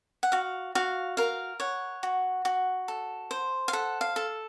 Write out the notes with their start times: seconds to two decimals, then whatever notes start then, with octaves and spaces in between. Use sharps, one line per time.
0.23 F#5
0.32 F#4 F5
0.75 F#4 F5
1.17 A#4 F5
1.60 C#5 F#5
2.03 F#4
2.45 F#4
2.88 A4
3.31 C5
3.68 F5
3.73 A4 F#5
4.01 F5
4.16 A4